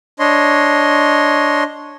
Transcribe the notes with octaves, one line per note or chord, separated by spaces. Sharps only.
D4 C#5 D#5 C6